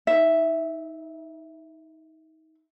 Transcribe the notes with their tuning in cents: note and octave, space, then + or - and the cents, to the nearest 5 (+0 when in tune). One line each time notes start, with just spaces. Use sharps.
D#4 +30 E5 +0